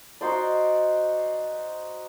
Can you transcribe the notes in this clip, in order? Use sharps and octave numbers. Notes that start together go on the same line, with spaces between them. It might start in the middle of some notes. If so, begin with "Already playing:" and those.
D#4 F#4 C5 D5